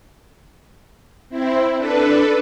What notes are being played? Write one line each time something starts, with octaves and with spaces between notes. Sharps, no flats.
C4 E4
D4 A4 B4